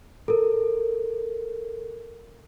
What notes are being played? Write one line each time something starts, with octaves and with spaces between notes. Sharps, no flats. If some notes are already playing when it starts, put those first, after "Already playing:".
A4 A#4